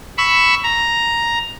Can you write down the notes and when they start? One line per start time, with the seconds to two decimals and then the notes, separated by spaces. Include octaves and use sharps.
0.18 B5 C#6 E6
0.64 A#5